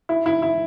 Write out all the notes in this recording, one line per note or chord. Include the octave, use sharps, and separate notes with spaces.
E4
E4
E4